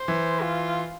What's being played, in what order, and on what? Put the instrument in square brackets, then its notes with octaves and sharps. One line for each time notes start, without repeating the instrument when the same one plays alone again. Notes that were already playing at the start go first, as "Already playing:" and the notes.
Already playing: [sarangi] C5
[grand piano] E3
[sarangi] F4